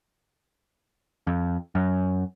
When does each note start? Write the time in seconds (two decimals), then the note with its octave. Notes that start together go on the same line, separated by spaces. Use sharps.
1.27 F2
1.75 F#2